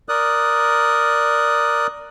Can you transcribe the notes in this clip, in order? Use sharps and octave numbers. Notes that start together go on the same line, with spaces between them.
A#4 D5 D#6 F#6